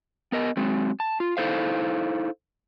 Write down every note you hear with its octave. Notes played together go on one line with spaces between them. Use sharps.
B3 A#4 D#5
F#3 G#3 C4
A5
F4
D#4 E4 A4 C5 F5